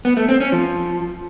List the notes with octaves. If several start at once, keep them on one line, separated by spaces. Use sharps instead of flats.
B3
A3
C4
C#4
F3